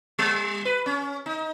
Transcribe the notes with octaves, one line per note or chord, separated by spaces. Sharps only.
G3
B4
C#4
D#4